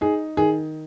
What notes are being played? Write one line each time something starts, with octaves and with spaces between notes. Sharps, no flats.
D#4 G#4
D#3 G#4